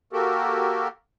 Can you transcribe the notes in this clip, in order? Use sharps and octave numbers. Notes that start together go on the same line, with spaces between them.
A#3 F#4 G4 A4 A#4